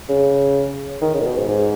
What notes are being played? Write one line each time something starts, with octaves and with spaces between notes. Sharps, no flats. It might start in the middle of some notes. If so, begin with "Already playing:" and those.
C#3
D#3
C#3
A#2
B2
G#2
G#2